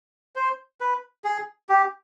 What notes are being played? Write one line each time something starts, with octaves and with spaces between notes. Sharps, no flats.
C5
B4
G#4
G4